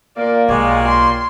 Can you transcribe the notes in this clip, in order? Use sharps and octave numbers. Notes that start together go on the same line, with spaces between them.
A#2 A#3 D5
B1 G#3 G4 C#5 D5
C6